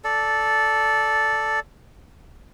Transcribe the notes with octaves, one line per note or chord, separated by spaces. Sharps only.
A4 D5